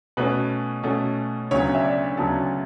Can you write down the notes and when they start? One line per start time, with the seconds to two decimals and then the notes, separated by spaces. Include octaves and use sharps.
0.17 B2 A3 C#4 B4
0.83 B2 A3 C#4
1.51 D2 C#3 F#3 B3 C#5
1.75 E5
1.84 D5
2.17 D2 C#3 F#3 B3 A5